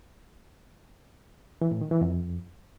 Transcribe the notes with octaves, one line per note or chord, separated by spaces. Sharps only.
E3
A2
D#3
E3
F2